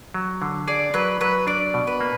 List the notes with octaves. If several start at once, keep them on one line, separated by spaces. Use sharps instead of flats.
F#3
D3
G#4 D5
F#3 B4
F#3 B4
D4 D5
B2
B4
A#3